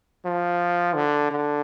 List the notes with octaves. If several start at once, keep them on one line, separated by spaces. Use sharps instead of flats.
F3
D3
D3